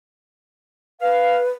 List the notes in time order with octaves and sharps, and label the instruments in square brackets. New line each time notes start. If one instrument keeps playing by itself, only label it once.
[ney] B4 [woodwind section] F5